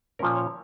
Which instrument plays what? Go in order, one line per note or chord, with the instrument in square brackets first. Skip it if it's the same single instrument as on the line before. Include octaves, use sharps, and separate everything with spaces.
[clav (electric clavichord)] A#2 F3 A#3 C#4 A#4
C#5